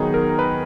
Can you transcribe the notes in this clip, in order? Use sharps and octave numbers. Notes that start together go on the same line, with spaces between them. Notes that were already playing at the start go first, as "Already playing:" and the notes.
Already playing: D#3 F#3 B3 D#4 G#4
A#4
B4